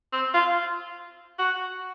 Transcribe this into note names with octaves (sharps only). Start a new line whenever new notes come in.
C4
F4
F#4